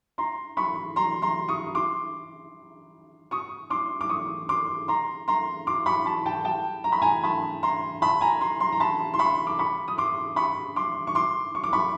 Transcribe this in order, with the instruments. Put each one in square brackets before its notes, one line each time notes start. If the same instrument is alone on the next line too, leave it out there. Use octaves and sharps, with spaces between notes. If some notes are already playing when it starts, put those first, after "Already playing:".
[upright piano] A#5 C6
B5 C#6
A#5 C6
A#5 C6
C#6 D#6
C6 D6
C#6 D#6
C6 D6
D6
C#6 D#6
C6 D6
A#5 C6
A#5 C6
C6 D6
B5 C#6
A5 B5
G5 A5
G5 A5
A#5
B5
G#5 A#5
A5 B5
A#5 C6
A5 B5
G#5 A#5
A#5 C6
A#5 C6
A#5
A5 B5
C6
B5 C#6
D6
B5 C#6
D#6
C6 D6
B5 C#6
C6 D6
C#6
C6 D6
C#6
D6
B5 C#6